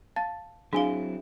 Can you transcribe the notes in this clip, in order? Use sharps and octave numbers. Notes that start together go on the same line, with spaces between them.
F5 A5 A6
F#3 C4 D4 E4 G#4 F5 G#5 G7